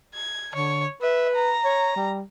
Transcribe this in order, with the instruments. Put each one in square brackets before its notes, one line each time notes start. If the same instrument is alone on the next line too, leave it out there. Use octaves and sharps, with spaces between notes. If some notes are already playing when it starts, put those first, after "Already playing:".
[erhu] G#6
[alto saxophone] D3 [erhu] C#5
[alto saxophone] B4 [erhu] E5
[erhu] A#5
[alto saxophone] C#5
G3